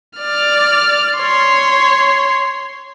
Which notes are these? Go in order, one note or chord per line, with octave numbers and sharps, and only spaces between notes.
D5 F6
C#5 C6